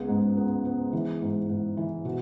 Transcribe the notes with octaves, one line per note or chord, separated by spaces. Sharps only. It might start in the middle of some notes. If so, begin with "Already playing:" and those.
Already playing: C#2 B3 G#4
G#2
B3
B3
E3
G#2
G#2
E3
B2 F#4